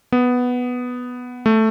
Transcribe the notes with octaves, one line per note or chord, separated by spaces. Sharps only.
B3
A3